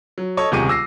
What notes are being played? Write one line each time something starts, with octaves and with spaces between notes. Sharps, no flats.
F#3
A4 C#5 D#5 A5 C#6
D#1 C#2 C3 G#4 C#6 D#7
D6 E6 A#6 C7